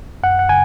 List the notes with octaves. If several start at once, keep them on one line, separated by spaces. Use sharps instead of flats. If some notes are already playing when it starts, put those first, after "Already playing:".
F#2 F#5
F#5
C#3 G#5